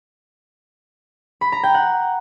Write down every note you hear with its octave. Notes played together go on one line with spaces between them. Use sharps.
B5
A#5
G5
F#5